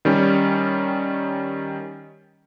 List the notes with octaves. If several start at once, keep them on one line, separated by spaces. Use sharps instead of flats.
D#3 G3 C#4